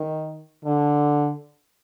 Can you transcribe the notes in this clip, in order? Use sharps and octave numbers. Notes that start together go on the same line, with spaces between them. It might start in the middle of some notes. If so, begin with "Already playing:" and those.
Already playing: D#3
D3